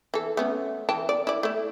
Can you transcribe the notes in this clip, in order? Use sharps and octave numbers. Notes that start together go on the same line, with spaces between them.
E3 A4
A3 B3 C#4
E3 G5 A5
D5
E4 D5
A3 E4